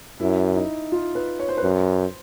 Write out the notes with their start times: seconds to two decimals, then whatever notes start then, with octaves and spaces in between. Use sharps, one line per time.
0.20 F#2 E4
0.56 D#4
0.92 F4
1.15 B4
1.39 C#5
1.49 C5
1.57 B4
1.63 F#2 C5